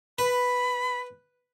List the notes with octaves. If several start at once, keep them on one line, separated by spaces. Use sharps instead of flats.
B4 B5